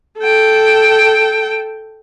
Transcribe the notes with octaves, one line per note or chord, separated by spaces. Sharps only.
A4 G5